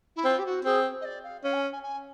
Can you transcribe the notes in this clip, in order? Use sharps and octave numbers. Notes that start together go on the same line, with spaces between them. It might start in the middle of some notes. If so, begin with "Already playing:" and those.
E4
C4 F4
G4
F#4
C4 G#4
D#5
D5
F5
C#4 F5
G#5
G#5
G#5